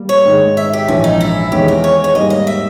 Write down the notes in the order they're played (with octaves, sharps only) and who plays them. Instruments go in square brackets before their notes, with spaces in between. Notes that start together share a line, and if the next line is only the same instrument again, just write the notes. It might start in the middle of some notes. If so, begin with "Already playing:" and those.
Already playing: [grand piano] G3 A#3
[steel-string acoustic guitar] C#5
[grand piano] G#2 D#3 G#3 D#4
[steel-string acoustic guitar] E5
G4
[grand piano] A#1 G#2 E3 [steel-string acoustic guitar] C#4
[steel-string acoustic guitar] D#4
E4
[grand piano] E2 D#3 G#3 C#4 [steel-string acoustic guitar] G4
[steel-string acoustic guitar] A#4
C#5
C#5
[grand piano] G#2 G3 A#3 [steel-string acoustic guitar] D#5
[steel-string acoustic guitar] D#5
E5